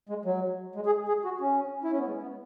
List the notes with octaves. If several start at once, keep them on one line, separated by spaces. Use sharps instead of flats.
G#3
F#3
G#3
G#4
G#4
F#4
C#4
E4
C#4
B3
G#3
B3